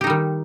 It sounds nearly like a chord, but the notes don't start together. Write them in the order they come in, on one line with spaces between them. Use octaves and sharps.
G4 D#4 G3 D#3